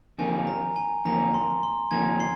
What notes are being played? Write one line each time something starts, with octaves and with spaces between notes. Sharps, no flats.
F2 D#3 A#3 G#5
A#5
G#5
F2 D#3 A#3 A#5
C6
C6
F2 D#3 A#3 G#5 G#6
C6 C7